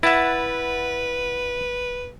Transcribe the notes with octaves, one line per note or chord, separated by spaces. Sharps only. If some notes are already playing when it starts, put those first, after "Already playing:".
E4 B4 E5 F#5 A6